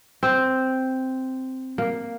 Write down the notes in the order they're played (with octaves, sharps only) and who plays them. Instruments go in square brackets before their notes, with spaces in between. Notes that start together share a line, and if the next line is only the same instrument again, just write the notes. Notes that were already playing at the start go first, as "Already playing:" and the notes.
[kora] C4
A#3